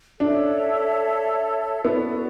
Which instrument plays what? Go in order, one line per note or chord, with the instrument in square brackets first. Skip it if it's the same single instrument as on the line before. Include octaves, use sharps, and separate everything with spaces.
[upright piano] D4 [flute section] A4 C#5 E5
[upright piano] B3 [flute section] F#4 A4 D5